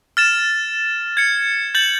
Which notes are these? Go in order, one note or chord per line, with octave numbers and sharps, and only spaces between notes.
F6 A6 E7
G#6 C#7
G6 A6 F#7